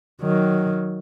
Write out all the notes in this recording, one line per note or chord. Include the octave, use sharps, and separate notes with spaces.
D#3 F#3